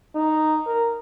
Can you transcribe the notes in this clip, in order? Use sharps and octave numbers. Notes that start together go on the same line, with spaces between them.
D#4
A#4